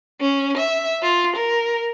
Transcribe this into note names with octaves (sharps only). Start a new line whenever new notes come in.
C#4
E5
F4
A#4